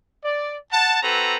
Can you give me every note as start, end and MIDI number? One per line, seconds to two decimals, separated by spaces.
0.23 0.56 74
0.71 1.00 78
0.71 1.00 81
1.02 1.36 60
1.02 1.36 66
1.02 1.36 69
1.02 1.36 71
1.02 1.36 82